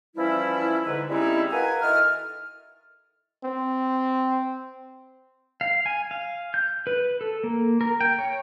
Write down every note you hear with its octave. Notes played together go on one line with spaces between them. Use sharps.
E3 F3 G3 C#4 E4
G#2 D3 B4
G3 G#3 C4 C#4 D#4 E4
F#4 A#4 B4 F5 G#5
D#3 E4 A4 D#5 F6
C4
F5
G#5
F5
G6
B4
A4
A#3
A#4
G5
C#5